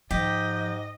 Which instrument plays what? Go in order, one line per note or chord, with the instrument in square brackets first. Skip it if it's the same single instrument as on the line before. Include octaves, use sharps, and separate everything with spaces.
[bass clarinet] G#2 [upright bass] F3 [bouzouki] G4 [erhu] D#5